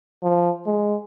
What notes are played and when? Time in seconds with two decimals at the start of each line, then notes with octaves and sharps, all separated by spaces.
0.23 F3
0.66 G#3